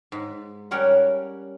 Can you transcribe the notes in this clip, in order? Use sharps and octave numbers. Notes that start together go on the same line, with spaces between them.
G#2
G3 C#4 A#4 C#5 F#5